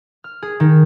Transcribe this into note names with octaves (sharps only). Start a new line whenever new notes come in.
F6
G#4
D#3